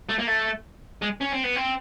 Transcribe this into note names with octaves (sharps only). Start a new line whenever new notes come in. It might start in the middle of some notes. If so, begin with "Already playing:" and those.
A3
A#3
A3
G#3
C#4
C4
B3
C4